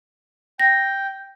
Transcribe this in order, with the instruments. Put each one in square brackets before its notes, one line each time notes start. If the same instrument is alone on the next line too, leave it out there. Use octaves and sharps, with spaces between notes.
[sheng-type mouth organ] G5 [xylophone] A#6